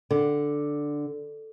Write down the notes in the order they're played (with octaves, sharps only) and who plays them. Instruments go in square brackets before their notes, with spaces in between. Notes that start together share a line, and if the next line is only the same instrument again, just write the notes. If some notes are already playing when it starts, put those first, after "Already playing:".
[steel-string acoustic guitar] D3